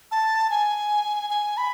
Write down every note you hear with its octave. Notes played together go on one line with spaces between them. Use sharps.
A5
G#5
G#5
B5